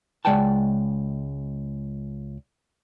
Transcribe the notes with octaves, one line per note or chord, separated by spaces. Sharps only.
C#2 G#3 D5 F#5 G5 A5